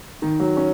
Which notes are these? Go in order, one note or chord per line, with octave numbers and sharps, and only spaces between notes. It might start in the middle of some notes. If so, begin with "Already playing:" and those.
D#3
F#3
C#4